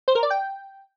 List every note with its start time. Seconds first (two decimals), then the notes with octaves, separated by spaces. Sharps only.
0.08 C5
0.15 A#4
0.23 D5
0.30 G5